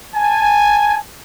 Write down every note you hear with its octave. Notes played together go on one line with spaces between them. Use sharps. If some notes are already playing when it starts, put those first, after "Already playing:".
G#5 A5